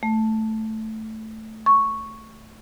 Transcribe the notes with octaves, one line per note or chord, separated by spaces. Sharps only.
A3
C#6